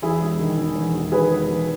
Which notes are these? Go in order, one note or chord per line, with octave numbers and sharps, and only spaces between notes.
E2 E4 G#4
E1
D#3
E1
E2
E1
D#3 G#4 B4
E1
E2